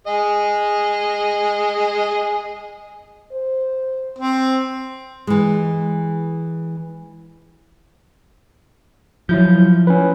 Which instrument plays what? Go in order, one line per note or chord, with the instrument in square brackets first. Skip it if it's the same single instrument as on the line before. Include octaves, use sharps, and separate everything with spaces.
[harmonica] G#4 D#5
[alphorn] C5
[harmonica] C4
[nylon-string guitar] E3 G#3
[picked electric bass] F3 [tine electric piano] F#3 E4 G6
[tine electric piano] C#4 B4